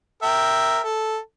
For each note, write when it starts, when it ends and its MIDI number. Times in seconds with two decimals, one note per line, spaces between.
0.23 0.81 70
0.23 0.81 76
0.23 0.81 79
0.84 1.18 69